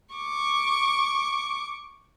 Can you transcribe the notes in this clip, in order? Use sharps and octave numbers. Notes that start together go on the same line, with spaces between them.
C#6 D6